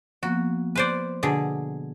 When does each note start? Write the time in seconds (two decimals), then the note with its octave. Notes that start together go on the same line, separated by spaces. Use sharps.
0.23 F3 A#3 B3 F#4
0.75 B4 C5 D5
1.23 B2 D3 G#4